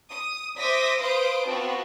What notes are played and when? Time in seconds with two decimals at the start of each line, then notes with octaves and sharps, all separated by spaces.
0.10 D#6
0.57 C5 E5 D6 D#6 A#6 B6
0.99 B4 C5 F5 C6 D#6 D7
1.45 B3 C4 F4 F#4 A5